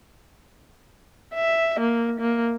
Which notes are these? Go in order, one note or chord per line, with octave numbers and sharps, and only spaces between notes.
E5
A#3
A#3